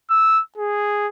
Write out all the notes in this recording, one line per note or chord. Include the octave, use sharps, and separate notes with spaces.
E6
G#4